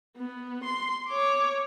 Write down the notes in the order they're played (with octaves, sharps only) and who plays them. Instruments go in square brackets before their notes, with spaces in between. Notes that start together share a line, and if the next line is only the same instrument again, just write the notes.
[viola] B3
C6
C#5 D6